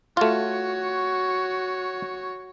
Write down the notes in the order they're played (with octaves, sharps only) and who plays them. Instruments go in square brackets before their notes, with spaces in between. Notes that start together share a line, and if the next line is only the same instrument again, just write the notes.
[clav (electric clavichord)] A3 F4 [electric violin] F#4 C#5